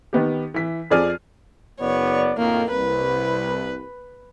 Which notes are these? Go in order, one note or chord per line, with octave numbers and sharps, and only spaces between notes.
D#3 B3 G4
E3 B6
F2 F3 G#4 D5 F6 D#7
F#1 B3 C#5 D5
F2 A2 D#3 A#3
C2 B4